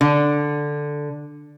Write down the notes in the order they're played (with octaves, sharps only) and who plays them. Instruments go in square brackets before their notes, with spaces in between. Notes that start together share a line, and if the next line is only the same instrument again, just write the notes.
[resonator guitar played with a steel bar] D3